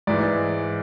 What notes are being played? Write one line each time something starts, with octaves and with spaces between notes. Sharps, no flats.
G#2 E3 D5